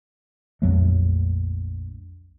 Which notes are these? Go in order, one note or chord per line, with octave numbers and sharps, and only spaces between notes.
A#1 F2 F#3 A3